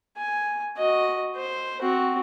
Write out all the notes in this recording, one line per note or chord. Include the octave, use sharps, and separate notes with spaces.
G#5
F#4 D#5
C5
C4 F#4